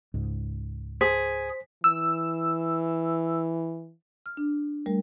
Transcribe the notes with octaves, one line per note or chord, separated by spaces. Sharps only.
C#2 G#2
G#4 C5 B6
E3 E6
F6
D4
G3 A3 A#4